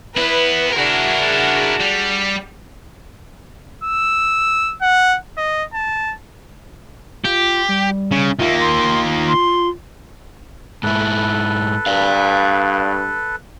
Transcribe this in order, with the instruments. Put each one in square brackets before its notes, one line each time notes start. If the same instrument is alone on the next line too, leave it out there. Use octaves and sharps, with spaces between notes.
[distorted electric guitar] B3 E4 [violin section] B4
[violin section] D4 F#4 G#4 [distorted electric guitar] E4 A#4
[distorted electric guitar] G3
[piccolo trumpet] E6
F#5
D#5
A5
[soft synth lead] F4 [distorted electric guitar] G4
[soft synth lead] G3
[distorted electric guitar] C#3
[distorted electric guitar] D#3 A#3 [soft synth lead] F4 [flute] E5
[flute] C6
C6
[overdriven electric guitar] G#2 E4 [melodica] A4 B4
[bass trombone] G2 [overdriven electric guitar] D5 F5